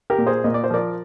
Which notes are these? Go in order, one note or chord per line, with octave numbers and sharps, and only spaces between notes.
G4 A#4
A#2
G#4 C5
A#2 D#5
D5
C5
F3 A#4 D5